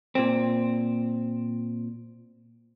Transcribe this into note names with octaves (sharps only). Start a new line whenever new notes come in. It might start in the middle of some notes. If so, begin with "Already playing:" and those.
A#2 C4